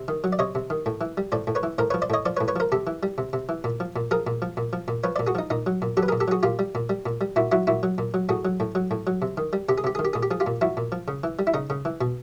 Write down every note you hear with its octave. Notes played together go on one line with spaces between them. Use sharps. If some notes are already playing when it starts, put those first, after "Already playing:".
Already playing: C3
D#3
F#3
D5
C3 C#5 D#5
C3
D#3
A2
E3
G3
A2 C5 D5
A2
B4 C#5
E3
A2 A#4 C5
B4 C#5
F3
C5 D5
A2 C#5 D#5
F3 C5 D5
B4 C#5
A2
B4 C#5
F3 A#4 C5
C3 G4 A4
E3
G3
C3
C3
E3
A#2
F3
A#2
F3 G#4 A#4
A#2
F3
A#2
F3
A#2
F3 B4 C#5
C5 D5
A#2
F#4 G#4
F3 D#4
A#2 D#4
F#3
A#2
F#3 G4 A4
B4
G#4 A#4
A#2
G4 A4
F#3 F#4 G#4
A#2 F4 G4
G3
A#2
G3
A#2
G3
A#2 E4 F#4
F#3 E4 F#4
A#2 E4 F#4
F#3
A#2
F#3
A2 F#4 G#4
F#3
A2
F#3
A2
F#3
C3
D#3
G3
C3 G4
G#4
C3 G4
G#4
D#3
G4
A#2 G#4
G4
F3 G#4
F4 G4
A#2
F3 E4 F#4
A#2
F3
C#3
E3
G3
E4
C#3 D#4
C#3
E3
B2